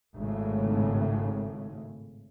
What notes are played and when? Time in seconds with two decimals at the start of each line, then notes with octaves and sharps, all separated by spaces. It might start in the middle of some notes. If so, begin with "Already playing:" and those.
0.16 G#1 A2 C#3